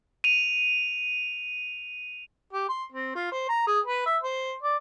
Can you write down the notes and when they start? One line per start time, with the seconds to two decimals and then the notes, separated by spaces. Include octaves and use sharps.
0.24 D#7 F7
2.53 G4
2.69 C6
2.93 C4
3.15 F4
3.32 C5
3.49 A#5
3.67 G#4
3.86 B4
4.06 E5
4.23 C5
4.63 D5